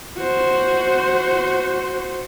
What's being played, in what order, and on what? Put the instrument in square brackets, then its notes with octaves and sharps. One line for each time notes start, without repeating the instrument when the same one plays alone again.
[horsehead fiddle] F#4 C5